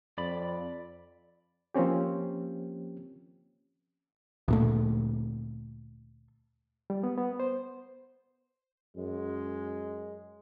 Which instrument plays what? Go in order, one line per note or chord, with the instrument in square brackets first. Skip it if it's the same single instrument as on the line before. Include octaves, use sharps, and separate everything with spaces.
[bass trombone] F2 [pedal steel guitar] D5 B5
[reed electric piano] F3 A#3 C4 C#4 G4
[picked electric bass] D2 A#2 A3
[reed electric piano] G3
B3
B3
C5
[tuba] F#2 [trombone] G#3